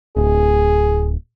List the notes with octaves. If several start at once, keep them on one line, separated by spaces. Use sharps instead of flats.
D1 G#4